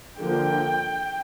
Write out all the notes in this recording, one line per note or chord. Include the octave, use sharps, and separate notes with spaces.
D3 F3 A#3 G5